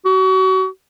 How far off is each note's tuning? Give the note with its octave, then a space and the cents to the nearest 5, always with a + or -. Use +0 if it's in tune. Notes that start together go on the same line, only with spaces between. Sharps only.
F#4 +35